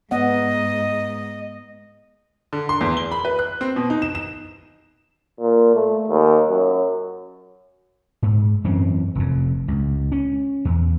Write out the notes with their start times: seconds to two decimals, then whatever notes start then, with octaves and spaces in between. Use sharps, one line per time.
0.11 G#2 B3 D5 D#5 F#5
2.53 D3
2.69 C6
2.81 E2
2.97 G7
3.12 B5
3.25 B4
3.39 F#6
3.61 C4
3.76 B2
3.90 D#4
4.02 E7
4.15 E7
5.40 A#2
5.75 A3
6.08 D#2
6.49 F#2
8.22 G#2
8.64 F#2 E3 C4 C#4
9.15 F1 F2
9.68 C#2
10.12 C#4
10.65 E2